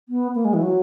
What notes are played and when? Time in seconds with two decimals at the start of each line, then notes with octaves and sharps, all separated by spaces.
0.09 B3
0.35 A#3
0.45 G#3
0.54 E3
0.62 F#3